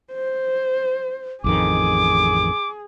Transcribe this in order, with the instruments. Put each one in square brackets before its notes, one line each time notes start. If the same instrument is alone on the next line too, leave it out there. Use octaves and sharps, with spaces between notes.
[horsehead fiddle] C5
[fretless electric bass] A1 F2 D#3 [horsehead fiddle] G#4 [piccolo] D6